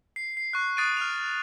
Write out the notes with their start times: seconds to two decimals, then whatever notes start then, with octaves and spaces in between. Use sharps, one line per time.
0.16 C7
0.37 C7
0.53 C#6 F#6
0.77 D#6 F#6 A6 C7 D7 D#7
0.97 F6 F7